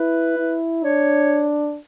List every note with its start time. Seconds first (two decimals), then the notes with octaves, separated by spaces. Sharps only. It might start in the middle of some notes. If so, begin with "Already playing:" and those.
Already playing: E4 B4
0.38 E4
0.83 D4 C#5